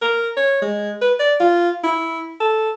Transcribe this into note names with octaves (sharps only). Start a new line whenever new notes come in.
A#4
C#5
G#3
B4
D5
F4
E4
A4